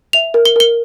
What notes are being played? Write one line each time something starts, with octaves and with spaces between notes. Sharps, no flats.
E5 F7
A#4
G7
A#4 G7